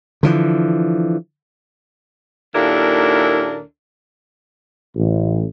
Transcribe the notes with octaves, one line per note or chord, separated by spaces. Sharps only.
D3 E3 F3
D#2 A#2 D4 E4 A4 A#4
A1